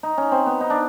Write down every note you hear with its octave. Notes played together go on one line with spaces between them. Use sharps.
D#4
C#4
C4
B3
D#4
D4